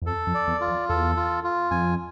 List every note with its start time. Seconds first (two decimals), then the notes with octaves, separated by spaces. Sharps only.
0.02 E2
0.06 F2 A4
0.27 F2
0.34 D5
0.47 E2
0.61 F4
0.68 F2
0.89 E2 A4
1.16 F4
1.44 F4
1.71 F2 G#5